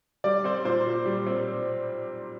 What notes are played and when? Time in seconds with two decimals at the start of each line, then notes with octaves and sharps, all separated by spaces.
0.24 G3 D5
0.44 C4 C5
0.65 A#2 C5
0.86 A#2
1.06 G3
1.27 C4